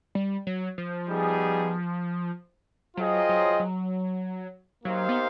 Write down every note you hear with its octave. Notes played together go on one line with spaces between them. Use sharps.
G3
F#3
F3
G3 B3 D#4 G#4
F#3 F4 G#4 C5 D#5 G5
F#3
F#3
F#3 A#3 D#4 G4 C5 F5
B3